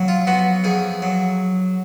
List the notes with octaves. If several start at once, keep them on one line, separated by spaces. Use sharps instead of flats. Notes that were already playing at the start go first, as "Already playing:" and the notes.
Already playing: F2 F#3
F4
B3 F#4
F2 G#4
F#3